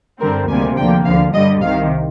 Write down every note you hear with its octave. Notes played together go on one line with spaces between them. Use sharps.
G2 D3 G3 C4 A#4
D2 C3 D#3 G3 A#3 G#5
D2 D3 F3 A#3 G5
D2 D3 F3 F5
G2 D3 G3 D#5
C2 C3 D#3 F5